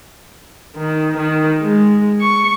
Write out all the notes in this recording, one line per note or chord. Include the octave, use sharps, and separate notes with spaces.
D#3
D#3
G#3
C#6